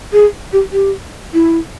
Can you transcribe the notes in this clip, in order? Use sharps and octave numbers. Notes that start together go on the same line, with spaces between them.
G#4
G4
G4
E4